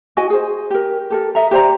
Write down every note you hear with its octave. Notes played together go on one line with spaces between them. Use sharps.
E4 F#4 D#5 G#5
G#4 C5
G4 A#4
G4 A4 A#4
D#5 E5 A#5
G4 C5 D5 A#5